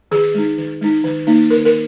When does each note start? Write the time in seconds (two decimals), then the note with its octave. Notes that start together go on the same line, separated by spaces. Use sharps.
0.11 D#3 G#4
0.34 G#3 D#4
0.58 D#3
0.81 G#3 D#4
1.04 D#3
1.27 A#3 D#4
1.50 D#3 A#4
1.65 A#4